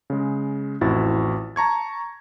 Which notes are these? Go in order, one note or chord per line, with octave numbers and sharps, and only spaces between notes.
C#3 G#3
A1 F2 E4 F#4 A6
A5 A#5 C#6 G#6